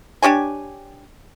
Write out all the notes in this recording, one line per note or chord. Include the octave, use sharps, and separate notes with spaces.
D4 G4 C#5 G#5